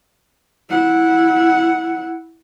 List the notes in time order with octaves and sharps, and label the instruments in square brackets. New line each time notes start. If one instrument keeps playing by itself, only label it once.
[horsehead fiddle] E4 F#5